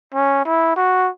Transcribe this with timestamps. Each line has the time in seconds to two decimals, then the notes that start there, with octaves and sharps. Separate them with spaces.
0.14 C#4
0.46 E4
0.76 F#4